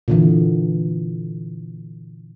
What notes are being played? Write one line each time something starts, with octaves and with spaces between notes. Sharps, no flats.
A#2 D3 E3